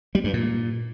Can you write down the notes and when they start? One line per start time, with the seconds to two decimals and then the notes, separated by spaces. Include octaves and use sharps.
0.15 G3
0.24 G2
0.33 A#2